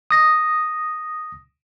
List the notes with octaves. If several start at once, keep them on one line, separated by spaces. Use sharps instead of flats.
D#6 A#6